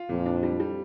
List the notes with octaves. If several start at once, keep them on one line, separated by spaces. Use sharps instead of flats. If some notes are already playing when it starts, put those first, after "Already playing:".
Already playing: F4
F2 A#2
D4
G3
G3